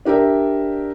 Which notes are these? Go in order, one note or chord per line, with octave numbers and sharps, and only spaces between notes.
D4 G4 A#4 D5 E5